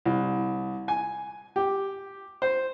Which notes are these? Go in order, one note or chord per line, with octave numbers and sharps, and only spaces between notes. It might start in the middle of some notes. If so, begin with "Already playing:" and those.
C2
G#5
G4
C5